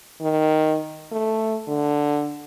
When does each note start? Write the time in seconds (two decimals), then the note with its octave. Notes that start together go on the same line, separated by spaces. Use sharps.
0.21 D#3
1.12 A3
1.68 D3